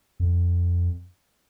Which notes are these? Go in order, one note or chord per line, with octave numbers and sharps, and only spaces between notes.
F2